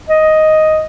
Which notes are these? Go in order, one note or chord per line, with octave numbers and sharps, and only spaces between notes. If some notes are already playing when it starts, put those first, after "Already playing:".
D#5